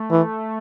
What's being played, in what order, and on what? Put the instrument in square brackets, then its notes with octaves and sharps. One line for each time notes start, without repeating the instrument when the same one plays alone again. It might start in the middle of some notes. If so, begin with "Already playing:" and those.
Already playing: [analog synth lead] A3
[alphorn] E3